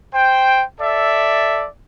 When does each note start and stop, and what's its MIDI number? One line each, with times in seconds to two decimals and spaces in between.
0.13 0.63 72
0.13 0.63 79
0.80 1.66 69
0.80 1.66 74
0.80 1.66 76